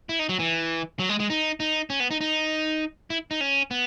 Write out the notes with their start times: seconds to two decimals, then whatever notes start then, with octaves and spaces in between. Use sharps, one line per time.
0.09 E4
0.19 D#4
0.29 F#3
0.39 E3
0.99 F#3
1.09 G#3
1.20 G#3
1.30 D#4
1.60 D#4
1.90 C#4
2.00 B3
2.11 D#4
2.21 D#4
3.10 E4
3.31 D#4
3.41 C#4
3.71 B3